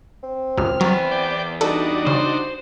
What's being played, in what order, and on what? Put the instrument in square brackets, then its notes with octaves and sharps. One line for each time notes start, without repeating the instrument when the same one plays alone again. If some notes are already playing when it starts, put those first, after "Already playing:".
[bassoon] C4
[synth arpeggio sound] C#2 F#2 [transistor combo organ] F6
[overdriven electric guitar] E2 B3 [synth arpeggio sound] F#3
[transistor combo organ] D5 G5
[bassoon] G3 [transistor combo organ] D4 D#4 F#4 [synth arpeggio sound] A4
[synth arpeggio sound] C#3 [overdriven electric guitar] C5